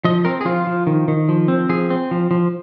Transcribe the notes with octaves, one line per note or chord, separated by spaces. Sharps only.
F3 D#5
C4 A#4
G#4
F3 F4
F3
D#3
D#3
F3
C4
F3 G#4
C4
F3
F3